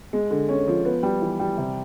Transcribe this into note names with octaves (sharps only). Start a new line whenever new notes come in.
G#3
D3
C#4
F3
B3
G3
E3
G3
C3